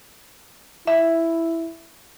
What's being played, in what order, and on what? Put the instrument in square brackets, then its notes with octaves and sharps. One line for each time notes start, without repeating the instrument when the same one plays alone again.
[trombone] E4 [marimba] E5